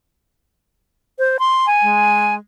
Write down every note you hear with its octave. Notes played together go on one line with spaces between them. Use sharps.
C5
C6
G#5
G#3